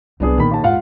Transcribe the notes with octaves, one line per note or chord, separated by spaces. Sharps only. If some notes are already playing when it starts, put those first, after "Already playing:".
C2 F#3 B3 D4 G#4
A#2 D#3 B5
D#2 A5
E2 G#2 F4 F5 F#5